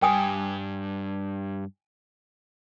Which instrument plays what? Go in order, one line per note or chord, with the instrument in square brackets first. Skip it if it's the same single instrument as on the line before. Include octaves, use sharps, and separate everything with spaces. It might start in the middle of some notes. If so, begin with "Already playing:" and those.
[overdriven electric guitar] G2 G4 [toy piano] G5 G#5 D#6